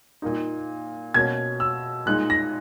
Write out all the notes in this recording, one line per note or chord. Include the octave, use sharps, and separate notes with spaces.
A#2 A#3 D#4
B2 A#3 C#4 G#6
E6
A#2 G#3 D#4 F#6
A#6